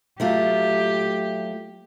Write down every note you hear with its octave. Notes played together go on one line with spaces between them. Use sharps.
F#3 A3 F4 G4